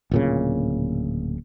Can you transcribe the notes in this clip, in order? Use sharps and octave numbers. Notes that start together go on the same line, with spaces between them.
D1 A#2 C#3